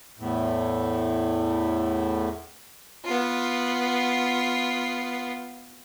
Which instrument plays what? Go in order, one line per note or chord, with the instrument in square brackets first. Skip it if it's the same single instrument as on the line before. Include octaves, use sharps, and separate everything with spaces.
[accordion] E2 A2
[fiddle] B3 F4